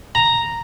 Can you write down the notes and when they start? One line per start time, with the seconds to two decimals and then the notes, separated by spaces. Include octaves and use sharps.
0.15 A#5